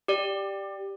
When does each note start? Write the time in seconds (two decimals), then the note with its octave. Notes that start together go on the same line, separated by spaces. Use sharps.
0.08 G4 D5